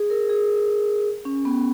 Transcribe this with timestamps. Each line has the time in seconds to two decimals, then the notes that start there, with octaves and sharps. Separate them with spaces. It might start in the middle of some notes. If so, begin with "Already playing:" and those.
Already playing: G#4
0.10 A#4
0.29 G#4
1.25 C#4
1.45 B3